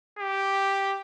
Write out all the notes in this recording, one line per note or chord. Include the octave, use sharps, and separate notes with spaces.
G4